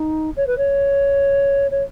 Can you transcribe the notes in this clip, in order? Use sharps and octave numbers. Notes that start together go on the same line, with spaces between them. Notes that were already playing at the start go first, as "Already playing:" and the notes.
Already playing: D#4
C#5
B4
C#5
C#5